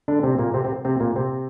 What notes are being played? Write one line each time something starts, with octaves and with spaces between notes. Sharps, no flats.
D3 D4
C3 C4
A#2 A#3
C3 C4
C3 C4
C3 C4
A#2 A#3
C3 C4